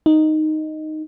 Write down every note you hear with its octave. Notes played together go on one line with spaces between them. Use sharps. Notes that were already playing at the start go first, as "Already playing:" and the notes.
D#4